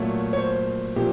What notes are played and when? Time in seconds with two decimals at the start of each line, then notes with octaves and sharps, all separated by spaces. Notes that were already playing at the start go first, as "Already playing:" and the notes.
Already playing: A#2 F#3 A3 C#5
0.33 C#5
0.38 C5
0.96 A#2 F3 G4